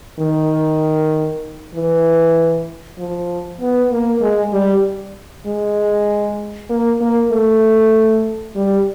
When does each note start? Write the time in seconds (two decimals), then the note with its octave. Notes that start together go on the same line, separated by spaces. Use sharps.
0.19 D#3
1.75 E3
2.98 F3
3.61 B3
3.91 A#3
4.21 G#3
4.53 G3
5.46 G#3
6.70 A#3
7.01 A#3
7.32 A3
8.56 G3